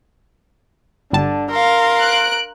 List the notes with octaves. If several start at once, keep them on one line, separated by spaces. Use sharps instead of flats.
G1 D3 G3 A5
A#4 F5 C6
F#6 D7